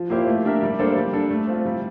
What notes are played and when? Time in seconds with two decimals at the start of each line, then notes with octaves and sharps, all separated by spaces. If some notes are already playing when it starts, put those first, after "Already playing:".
Already playing: F3
0.10 A#3 E4 G4 C5
0.27 A3
0.45 D4 G4 A#4 E5
0.62 G3
0.79 A#3 D4 A4 C5
0.96 G3
1.13 D4 A4
1.30 A3
1.47 C4 F4
1.65 G3